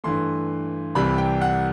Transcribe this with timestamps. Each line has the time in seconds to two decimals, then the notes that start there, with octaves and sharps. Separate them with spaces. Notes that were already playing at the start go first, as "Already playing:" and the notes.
0.04 G2 E3 A3 C6
0.95 C2 C3 E3 G3 B5
1.18 G5
1.41 F#5